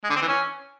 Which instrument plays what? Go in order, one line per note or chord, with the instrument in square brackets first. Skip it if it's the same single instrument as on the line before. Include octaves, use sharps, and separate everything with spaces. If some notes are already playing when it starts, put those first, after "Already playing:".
[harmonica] G#3
D3
C4
E3
C#4